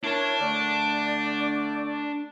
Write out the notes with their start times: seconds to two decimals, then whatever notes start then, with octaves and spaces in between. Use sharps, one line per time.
0.04 D4 E4 A#4 C#5 A5
0.40 D3 A3 D5